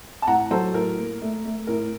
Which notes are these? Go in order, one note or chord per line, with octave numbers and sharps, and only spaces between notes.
A5
A2 F#5 A#5
F#3 A4 C5
A2 A#4
A#3
A3
A3
A2 A#4